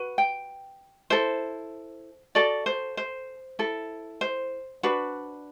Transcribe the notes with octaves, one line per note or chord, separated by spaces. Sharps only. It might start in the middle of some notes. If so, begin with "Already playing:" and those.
Already playing: F#4 B4
G5
E4 A4 C5
F#4 A4 D5
C5
C5
E4 A4
C5
D4 F#4 B4